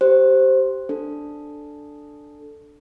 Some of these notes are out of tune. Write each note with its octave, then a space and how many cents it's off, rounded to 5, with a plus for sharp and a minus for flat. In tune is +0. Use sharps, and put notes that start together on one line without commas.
G4 -15 C5 +0
D4 +0 A4 +0